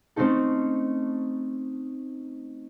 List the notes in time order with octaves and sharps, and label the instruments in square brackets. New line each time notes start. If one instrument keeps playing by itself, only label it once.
[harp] A3 C4 C#4 D#4 A4